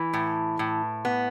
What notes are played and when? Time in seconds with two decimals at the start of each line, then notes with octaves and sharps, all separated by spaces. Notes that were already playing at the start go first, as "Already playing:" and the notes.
Already playing: E3
0.13 A2
0.59 A2
1.05 B3